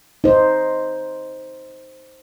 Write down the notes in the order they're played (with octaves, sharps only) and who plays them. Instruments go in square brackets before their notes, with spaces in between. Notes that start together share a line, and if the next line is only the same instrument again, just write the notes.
[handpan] D#4 C5